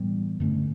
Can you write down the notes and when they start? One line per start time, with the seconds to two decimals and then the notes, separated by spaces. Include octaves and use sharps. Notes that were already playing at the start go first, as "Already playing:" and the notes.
Already playing: A2 E3 G3 B3
0.40 G2 D3 A3 C#4